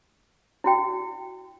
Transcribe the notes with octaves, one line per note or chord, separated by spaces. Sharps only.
E4 F#4 G5